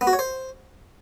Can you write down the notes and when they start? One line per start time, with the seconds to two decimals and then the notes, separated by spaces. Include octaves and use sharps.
0.01 B3
0.07 F#4
0.13 C#5
0.19 C5